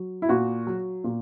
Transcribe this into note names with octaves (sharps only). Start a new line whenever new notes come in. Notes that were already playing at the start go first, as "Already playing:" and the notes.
Already playing: F#3
E4
A#2 F#4
F#3
A#2